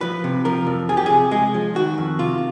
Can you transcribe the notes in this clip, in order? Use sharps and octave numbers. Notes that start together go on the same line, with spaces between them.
F3 B4
C3
F3 A#4
F2
F3 G#4
G4
C3 G#4
G#3 G#4
F3
D#3 F#4
F2
C3 F4